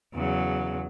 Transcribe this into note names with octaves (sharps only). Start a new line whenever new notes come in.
E2 C#3 F#3